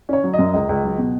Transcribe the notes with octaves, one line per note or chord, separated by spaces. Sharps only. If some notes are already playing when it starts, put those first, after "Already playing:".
C#4 C#5
F#3
D#5
F#2
C#2 D#5
C#2
F#3
B2